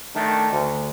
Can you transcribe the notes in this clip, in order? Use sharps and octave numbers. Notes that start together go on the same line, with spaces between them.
D#3 A3 D4
D2